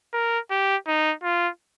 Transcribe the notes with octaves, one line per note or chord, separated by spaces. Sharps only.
A#4
G4
D#4
F4